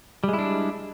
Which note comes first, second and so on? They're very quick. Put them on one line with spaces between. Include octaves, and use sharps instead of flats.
G3 G#3 E4 D4